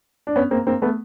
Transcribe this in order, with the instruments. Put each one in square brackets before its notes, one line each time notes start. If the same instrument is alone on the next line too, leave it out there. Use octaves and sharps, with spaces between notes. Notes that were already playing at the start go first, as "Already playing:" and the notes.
[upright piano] D4
B3 C#4
A#3 C4
A#3 C4
A3 B3